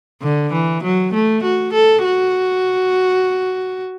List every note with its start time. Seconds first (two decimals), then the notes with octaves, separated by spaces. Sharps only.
0.22 D3
0.52 E3
0.83 F#3
1.13 A3
1.43 F#4
1.73 A4
2.04 F#4